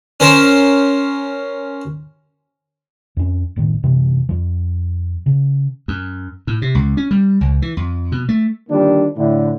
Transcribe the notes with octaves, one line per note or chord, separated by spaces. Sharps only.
C#4 A#4 C5
F2 C#4
F#1 A2 D#3
F#2 C3 E3
F2 F3
C#3
F#2
A2
C3
C#2
C#4
G3
C#2
E3
F2
B2
A3
D3 D#3 F3 G3 A#3 D4
A2 D3 E4